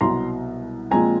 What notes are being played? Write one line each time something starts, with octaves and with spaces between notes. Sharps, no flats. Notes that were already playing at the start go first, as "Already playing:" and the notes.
C2 B2 F#3 A#5 C6
A#2 F3 G#3 C4 G#5 A#5